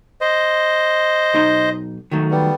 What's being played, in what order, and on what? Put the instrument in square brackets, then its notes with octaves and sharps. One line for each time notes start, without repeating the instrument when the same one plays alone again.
[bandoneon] C5 D#5
[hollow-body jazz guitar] B1 D#4 C6
D#3 F#3 A3
[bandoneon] G3 B3